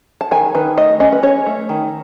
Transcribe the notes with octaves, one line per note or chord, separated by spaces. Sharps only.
A5
D#3 G#5
D#3 B4
A3 D#5
C#4 D#5
B4
C#4 C#5
A3
D#3